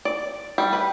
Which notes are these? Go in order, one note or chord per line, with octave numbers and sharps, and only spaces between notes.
D5
G3
B4